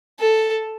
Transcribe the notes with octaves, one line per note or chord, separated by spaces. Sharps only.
A4